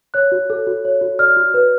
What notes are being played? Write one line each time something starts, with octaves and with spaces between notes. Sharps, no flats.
C#5 F#6
F#4
A4
F#4
C#5
F#4
D5 F6
F#4
B4